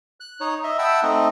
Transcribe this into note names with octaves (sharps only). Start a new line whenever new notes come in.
F#6
D#4 C#5
D#5 E5
E5 F#5 G5 A5 B5 E6
A3 C4 D#4 D#5